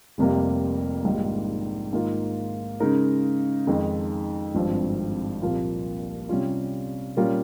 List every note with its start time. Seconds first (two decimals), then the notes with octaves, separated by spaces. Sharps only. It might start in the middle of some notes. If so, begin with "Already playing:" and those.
0.18 F1 F2 C3 G3 A#3
1.04 A#1 G#2 D#3 G3 A#3
1.93 G#2 D#3 A#3 F4
2.80 C#3 G#3 D#4 A#4
3.67 F2 D#3 G#3 D#4
4.55 G#1 G2 F3 C4
5.42 C2 A#2 F3 A#3 F4
6.29 C3 G3 C#4 F4
7.17 A#2 G3 C#4 F4 A#4